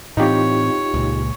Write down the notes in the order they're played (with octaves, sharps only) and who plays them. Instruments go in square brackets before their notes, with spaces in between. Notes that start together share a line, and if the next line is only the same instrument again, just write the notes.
[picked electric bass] A2 E3 C4 [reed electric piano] D#4 F4 G4 [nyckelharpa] C#5
[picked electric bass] C#2 A#2